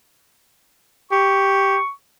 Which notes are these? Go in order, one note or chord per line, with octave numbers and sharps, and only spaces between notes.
G4 C#6